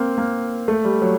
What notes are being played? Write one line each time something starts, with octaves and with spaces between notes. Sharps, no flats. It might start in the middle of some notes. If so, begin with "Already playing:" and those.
Already playing: A#3 C4
A#3
A3
G3
F#3